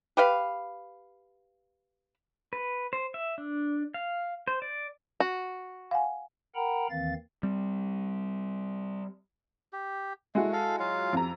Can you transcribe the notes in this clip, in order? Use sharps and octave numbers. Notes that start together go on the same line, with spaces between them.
G4 B4 F5
B4
C5
E5
D4
F5
C5
D5
F#4
F5 F#5 G#5
A#4 F#5 G5 A#5 B5
D#2 D#3 E3 C4 F5 A6
G3 C4
G4
G#3 A3 E4 F#4
A4 F5
F#3 F4 F5
F2 A#5